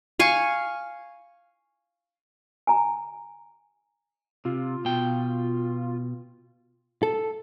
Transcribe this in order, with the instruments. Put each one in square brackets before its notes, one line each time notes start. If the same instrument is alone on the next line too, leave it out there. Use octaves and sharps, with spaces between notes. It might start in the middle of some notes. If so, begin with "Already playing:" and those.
[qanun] F5 G#5 C#6
[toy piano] G#5 A#5
[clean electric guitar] C3 [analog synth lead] F4
[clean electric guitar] B2 G5
[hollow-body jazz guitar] A4